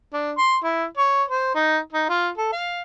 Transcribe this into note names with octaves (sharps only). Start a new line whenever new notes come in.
D4
C6
E4
C#5
C5
D#4
D#4
F4
A4
F5